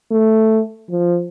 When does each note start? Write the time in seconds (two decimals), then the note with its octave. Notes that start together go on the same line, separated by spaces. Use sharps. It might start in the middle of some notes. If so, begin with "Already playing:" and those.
0.11 A3
0.90 F3